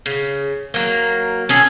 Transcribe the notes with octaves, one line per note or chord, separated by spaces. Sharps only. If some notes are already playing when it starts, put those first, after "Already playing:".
C#3
F#3 A#3
C#4 G#4 A4